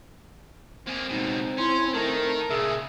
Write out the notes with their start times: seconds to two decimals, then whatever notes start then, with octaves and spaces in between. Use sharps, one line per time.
0.87 A#3 C4 G#4
1.10 C#2 B2 D#4
1.58 C#4 E4 C6
1.93 D#3 A3 D#4 A#4
2.50 A#2 C#3 G#4 E5